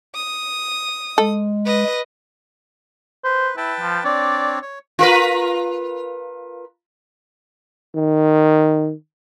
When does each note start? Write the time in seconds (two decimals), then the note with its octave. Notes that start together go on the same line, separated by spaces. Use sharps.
0.15 D#6
1.18 G#3 A4
1.65 B4 D#5
3.24 B4 C5
3.57 E4 B4 G5 A5
3.80 F3
4.04 C4 D4 C#5 D5
4.62 C#5
4.99 F4 A#4 B4
7.95 D#3